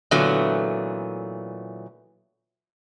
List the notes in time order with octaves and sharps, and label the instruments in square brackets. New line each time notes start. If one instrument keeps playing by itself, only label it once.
[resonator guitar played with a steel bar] A#2 D3 E3 F#3 A3 B3